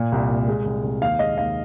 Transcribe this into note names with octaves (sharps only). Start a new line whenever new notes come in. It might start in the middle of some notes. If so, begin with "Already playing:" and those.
Already playing: A#2
C2
A#2
G#3
C2
C2
D#2 F5
G#3 D#5
D#2 F5